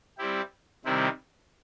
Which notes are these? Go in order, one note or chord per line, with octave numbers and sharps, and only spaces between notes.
G3 C4 E4 G4
C3 D#3 G3 C4 E4